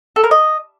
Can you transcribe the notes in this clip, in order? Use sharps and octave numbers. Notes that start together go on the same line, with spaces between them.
A4
A#4
D#5